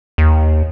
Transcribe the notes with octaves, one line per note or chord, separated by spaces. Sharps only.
D#2